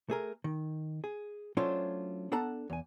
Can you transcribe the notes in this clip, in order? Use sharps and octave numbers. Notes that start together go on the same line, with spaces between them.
A3 G#4 A#4
D#3
G#4
F#3 A3 C#4 D4 F4 C5
B3 D4 A4 F#5 A5 A#5
E2 G#5